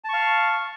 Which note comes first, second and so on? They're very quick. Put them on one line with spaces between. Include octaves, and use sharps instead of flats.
A5 C#6 F5